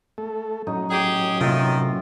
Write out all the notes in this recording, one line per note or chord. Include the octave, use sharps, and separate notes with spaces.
A3 A4
A2 F#3 C#4 D#4
G4 G#4
C3 D#3 F3 A#3 F4 E5